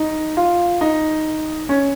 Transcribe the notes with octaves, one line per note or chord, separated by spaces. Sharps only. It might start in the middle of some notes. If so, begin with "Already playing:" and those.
Already playing: D#4
F4
D#4
C#4